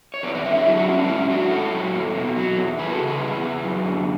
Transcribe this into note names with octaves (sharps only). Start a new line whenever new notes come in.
C#5
E2 B4 D5
B4 D5
D3 C#5 E5
C#5 E5
F#3 E4 G#4
D4 F#4
E2 C#4 E4
B3 D4
G#2 C#4 E4
E4
F#3 D4 F#4
G#2 A4 C#5
F#3
E2
B2
F#3
E2
E2 G#4 B4
F#4 A4
C#3
G#4 B4
E3
E2
F#2
D3